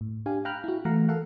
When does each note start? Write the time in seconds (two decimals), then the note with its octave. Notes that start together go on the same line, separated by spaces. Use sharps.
0.01 A2
0.26 D4 G4 F5 G#5
0.45 F5 G5 A#5 B5 F6 F#6
0.64 E4 F#4
0.85 E3 A3 F5 F#5 A#5
1.09 A4 A#4 F5 F#5